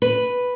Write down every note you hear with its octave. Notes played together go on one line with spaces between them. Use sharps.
B4